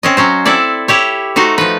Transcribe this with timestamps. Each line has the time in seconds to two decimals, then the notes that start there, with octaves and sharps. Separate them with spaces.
0.03 C4 C#4 D#5
0.17 F#3 C#4 C5
0.45 C4 E4 A4 D5
0.88 E4 G4 C#5
1.36 A3 D#4 F#4 C5
1.58 F3 B4